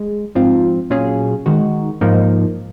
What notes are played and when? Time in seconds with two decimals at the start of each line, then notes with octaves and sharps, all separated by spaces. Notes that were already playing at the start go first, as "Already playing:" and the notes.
Already playing: G#3
0.35 G#2 F3 C4 F4
0.90 A#2 F#3 C#4 F4 G#4
1.46 D#3 G#3 D#4 F#4
2.01 G#2 F3 A#3 D#4